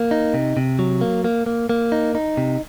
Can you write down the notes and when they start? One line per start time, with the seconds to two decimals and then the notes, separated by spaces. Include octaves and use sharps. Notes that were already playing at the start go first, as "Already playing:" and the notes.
Already playing: A#3
0.11 D#4
0.34 C3
0.57 C3
0.79 F#3
1.01 A#3
1.24 A#3
1.46 A#3
1.70 A#3
1.92 D#4
2.15 D#4
2.37 C3